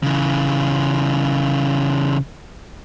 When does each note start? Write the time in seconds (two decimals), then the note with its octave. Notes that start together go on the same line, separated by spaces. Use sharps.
0.03 C#3 E3